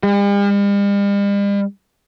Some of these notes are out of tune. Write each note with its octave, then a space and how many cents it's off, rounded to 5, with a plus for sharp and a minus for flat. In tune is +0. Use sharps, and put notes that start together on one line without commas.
G3 +45